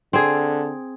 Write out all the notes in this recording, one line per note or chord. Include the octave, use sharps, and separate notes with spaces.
D3 C4 G#4